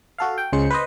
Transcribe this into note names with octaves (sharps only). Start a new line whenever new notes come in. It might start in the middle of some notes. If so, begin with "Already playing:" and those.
F#4 A4 F5
G5
C#2 C#3 G#3 C5 C#7
B4 C5 D#5